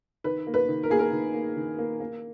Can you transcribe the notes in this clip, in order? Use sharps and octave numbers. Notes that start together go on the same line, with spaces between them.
D#3 B4
A#3
B4
D#3
A#4
A#3 G#4
A#4
D#3
A#3
D#3
A#3
A#3